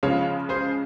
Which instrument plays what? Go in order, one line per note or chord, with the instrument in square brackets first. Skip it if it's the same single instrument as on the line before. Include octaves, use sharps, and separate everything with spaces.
[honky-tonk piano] C#3 F3 G#3 [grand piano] C#5 F5
[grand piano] G#4 C5